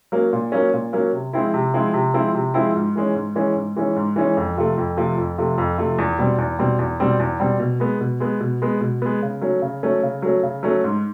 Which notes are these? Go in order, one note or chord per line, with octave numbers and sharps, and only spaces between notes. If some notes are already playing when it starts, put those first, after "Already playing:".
F#3 A#3 C#4
A#2
F#3 A#3 C#4
A#2
F#3 A#3 C#4
C3
F3 G#3 C4 E4
C3
F3 G#3 C4 E4
C3
F3 G#3 C4 E4
C3
F3 G#3 C4 E4
G#2
E3 G#3 C#4
G#2
E3 G#3 C#4
G#2
E3 G#3 C#4
G#2
E3 G#3 C#4
F2
C3 F3 A3
F2
C3 F3 A3
F2
C3 F3 A3
F2
C3 F3 A3
E2
B2 G3 C4
E2
B2 G3 C4
E2
B2 G3 C4
E2
B2 G3 C4
B2
G#3 B3
B2
G#3 B3
B2
G#3 B3
B2
G#3 B3
C#3
F#3 A3 C#4
C#3
F#3 A3 C#4
C#3
F#3 A3 C#4
C#3
F#3 A3 C#4
G#2